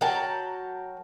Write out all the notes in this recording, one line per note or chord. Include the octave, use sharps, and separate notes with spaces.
F#3 A#4 G5 A5